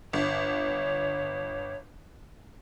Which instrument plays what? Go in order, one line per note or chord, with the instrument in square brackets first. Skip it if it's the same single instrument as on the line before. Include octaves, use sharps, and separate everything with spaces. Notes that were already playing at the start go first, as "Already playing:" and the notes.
[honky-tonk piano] G1 [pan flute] C#5